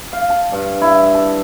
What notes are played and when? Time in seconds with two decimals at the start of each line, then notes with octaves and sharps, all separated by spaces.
0.13 F5
0.30 A5
0.52 G2
0.81 E4
1.14 A5